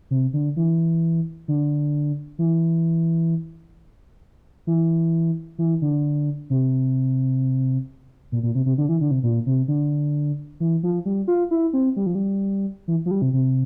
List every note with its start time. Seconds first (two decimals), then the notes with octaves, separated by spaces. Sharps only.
0.11 C3
0.33 D3
0.56 E3
1.48 D3
2.39 E3
4.67 E3
5.59 E3
5.82 D3
6.50 C3
8.32 A#2
8.43 A#2
8.55 C3
8.66 C3
8.78 D3
8.89 E3
9.01 D3
9.11 C3
9.23 A#2
9.46 C3
9.68 D3
10.60 E3
10.83 F3
11.05 G3
11.28 F4
11.51 E4
11.73 C4
11.96 G3
12.06 F3
12.15 G3
12.88 E3
13.06 F3
13.11 G3
13.22 C3
13.33 C3